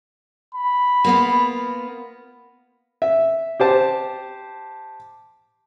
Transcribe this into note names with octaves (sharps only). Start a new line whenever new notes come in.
B5
A#3 B3 F4
E5
G4 C5 A5